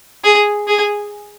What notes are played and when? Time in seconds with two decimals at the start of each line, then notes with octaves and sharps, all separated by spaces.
0.24 G#4
0.67 G#4